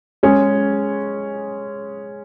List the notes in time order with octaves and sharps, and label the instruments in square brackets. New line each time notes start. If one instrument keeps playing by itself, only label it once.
[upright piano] G#3 C#4 G#4